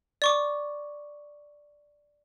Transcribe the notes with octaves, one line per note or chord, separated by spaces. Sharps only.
D5 C#6 D6